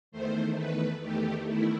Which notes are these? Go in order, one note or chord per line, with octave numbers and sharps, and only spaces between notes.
E2 D#3 A3 C5
B4
E2 D#3 A3 G4
E4